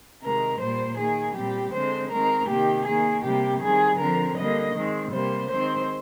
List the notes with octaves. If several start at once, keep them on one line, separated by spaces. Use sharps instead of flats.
C3 D#3 G#3 A#4
A#2 G3 A#3 C5
D#3 A#3 G#4
A#2 G3 C4 G4
D3 G#3 C4 C5
D#3 G#3 C4 A#4
C3 D#3 A#3 G4
D#3 A#3 G#4
C3 G3 A#3 G4
D#3 G3 C4 G#4
D3 F3 C4 A#4
D3 G3 A#3 D#5
D#3 G#3 C4
C3 G3 A#3 C5
D#3 G#3 C4 C5